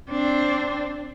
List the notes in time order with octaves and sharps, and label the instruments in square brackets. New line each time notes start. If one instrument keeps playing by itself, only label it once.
[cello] C4 D4